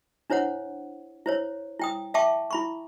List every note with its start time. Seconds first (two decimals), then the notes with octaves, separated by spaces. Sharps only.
0.30 D4 E4 C5 C#5 F#5
1.26 E4 C5 C#5
1.80 E4 G5 D#6
2.14 E5 F5 G5 A5 C#6 D6
2.51 E4 B5 C#6